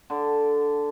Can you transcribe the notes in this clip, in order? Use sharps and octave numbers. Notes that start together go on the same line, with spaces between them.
D3